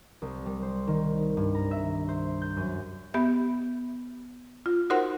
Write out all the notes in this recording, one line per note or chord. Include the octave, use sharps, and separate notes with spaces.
C2
G3
C5
D#3
G2
A#5
E5
C5
G6
F#2
B3 G4 E5
F4
D#4 F#4 A#4 C5 F#5 C6